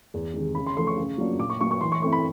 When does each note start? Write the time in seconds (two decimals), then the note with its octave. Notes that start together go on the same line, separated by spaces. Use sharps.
0.14 E2
0.34 C3 D#3 G#3
0.55 C#3 B5
0.66 C6
0.77 F3 A3 C6
0.87 C#6
0.97 C#3
1.18 F#3 A#3 D4 F4
1.39 A#2 D6
1.50 C#6
1.61 F#3 A#3 C#6
1.71 C#6
1.81 E3 C6
1.92 C#6
2.02 A3 C4 E4 C#6
2.12 B5